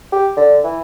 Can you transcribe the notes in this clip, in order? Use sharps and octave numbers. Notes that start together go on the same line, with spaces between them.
G4
D3
E3